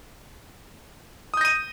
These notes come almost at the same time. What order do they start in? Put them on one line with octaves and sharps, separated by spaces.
D#6 G6 A#6 D#7